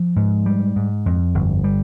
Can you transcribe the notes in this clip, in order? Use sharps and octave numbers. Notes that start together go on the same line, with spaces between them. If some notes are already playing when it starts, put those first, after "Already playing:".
Already playing: F3
G#2
G3
G#2
F2
G1
G3